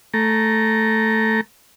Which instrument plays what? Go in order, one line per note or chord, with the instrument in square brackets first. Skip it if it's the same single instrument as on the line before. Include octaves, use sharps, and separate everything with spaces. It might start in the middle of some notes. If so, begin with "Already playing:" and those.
[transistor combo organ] A3 A#5